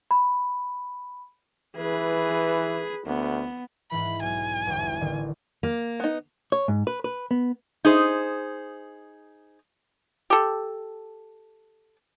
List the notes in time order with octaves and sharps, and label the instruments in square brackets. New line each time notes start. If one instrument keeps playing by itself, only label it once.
[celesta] B5
[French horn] E3 [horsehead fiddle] G#4 B4
[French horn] D2 [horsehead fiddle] B3
[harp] G#2 E3 [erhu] B5
[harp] B1 [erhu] G#5
[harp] G1 E2
A1 D3 D#3
[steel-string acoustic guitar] A#3
[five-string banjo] B3 D#4
[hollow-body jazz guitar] C#5
G#2
B4
B4
B3
[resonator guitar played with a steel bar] D#4 G#4 C5
[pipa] G4 A4